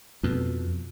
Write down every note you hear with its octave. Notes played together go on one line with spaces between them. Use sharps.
F2 B2